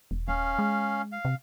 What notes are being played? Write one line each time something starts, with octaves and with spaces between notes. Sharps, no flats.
E1
D#1 C#4 F5
G#3
F5
C3